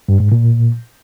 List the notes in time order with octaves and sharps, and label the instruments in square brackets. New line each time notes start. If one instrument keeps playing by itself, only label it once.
[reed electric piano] G2
G#2
A#2